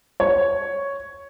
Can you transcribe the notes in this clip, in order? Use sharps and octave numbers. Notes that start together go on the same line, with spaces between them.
C#5